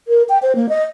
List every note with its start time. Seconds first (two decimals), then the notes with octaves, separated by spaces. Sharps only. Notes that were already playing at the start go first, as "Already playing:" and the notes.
0.08 A#4
0.29 G5
0.43 C5
0.55 A#3
0.69 D#5